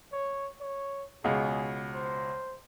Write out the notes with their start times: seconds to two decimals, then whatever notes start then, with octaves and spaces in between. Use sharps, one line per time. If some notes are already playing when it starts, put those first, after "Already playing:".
0.12 C#5
0.61 C#5
1.24 C#2 B2 G#4
1.94 C5